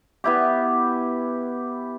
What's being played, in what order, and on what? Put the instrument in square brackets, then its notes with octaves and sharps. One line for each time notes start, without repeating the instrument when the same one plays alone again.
[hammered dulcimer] B3 E4 G4